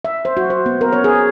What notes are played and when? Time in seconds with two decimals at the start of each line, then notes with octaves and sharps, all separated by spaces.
0.05 E5
0.25 C5
0.37 F#4
0.50 C5
0.66 B3
0.81 A#4
0.93 C#5
1.04 G#4